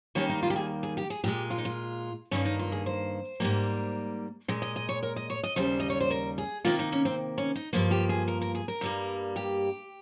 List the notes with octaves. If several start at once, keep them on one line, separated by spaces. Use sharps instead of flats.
D#2 D#3 G3 A#3 C#4
D#4
F4
G4
G#4
G#4
G4
G#4
A#2 G#3 G4
F4
D#4
F4
G2 D#3 A#3 C#4
D#4
F4
G#4
C5
G#2 G3 A#3
A#2 G#3
D#5
D#5
C#5
A#4
D#5
C#5
D#5
D#2 C#3 G3 C5
D#5
C#5
C5
A#4
G#4
C3 D#3 A#3 F4
D#4
C#4
C4
C#4
D#4
G2 F3 A#3 F4
G4
G#4
A#4
A#4
G#4
A#4
G2 G3 A#3
G4